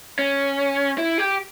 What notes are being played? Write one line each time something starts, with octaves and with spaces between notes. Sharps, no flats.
C#4
E4
G4